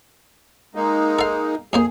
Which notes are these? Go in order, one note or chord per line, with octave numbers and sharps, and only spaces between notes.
G#3 A#3 D#4
A4 F5
F2 A#3 G#4 C5